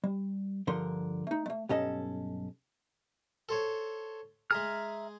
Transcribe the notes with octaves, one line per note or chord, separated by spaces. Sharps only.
G3
G2 D3 F3 A#4 C6
A3 D#4
G#3 A3
B1 G2 C#4 A4 D#5
A4 C5 C#5
G#3 G#4 E5 A#5 F6